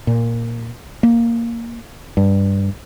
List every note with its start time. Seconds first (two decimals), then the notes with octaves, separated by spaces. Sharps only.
0.07 A#2
1.03 A#3
2.17 G2